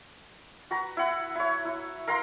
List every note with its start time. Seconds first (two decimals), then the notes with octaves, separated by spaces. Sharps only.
0.71 F#4 B4 A#5
0.97 E4 F#5
1.35 E4 C#5
1.65 E4
2.07 A#4 F5 A#5 C6